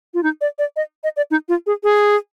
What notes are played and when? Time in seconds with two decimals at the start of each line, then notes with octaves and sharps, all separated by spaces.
0.14 F4
0.23 D#4
0.41 D5
0.59 D5
0.76 D#5
1.04 D#5
1.17 D5
1.31 D#4
1.49 F4
1.67 G#4
1.83 G#4